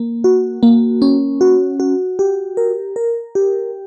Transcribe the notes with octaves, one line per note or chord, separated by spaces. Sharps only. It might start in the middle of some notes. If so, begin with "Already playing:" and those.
Already playing: A#3
F#4
A#3
C#4
F#4
F#4
G4
A#4
A#4
G4